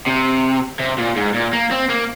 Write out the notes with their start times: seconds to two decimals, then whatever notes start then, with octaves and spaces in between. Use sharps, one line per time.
0.06 C3
0.80 C3
0.98 A#2
1.16 G#2
1.34 A#2
1.53 A#3
1.71 C4
1.90 A#3